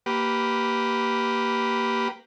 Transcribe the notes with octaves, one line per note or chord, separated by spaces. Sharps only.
A#3 G4 B4